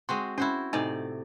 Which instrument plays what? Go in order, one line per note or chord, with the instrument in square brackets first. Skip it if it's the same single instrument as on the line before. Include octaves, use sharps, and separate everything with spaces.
[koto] G#3 C4 F#4 [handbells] C6
[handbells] C#4 [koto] E4 F#4 C5
[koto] A2 C3 D5 [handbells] D#4 D#5 G#5